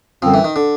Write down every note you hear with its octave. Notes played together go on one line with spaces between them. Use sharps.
F#2 D3 F3 G3 C4
E3
D#3
D3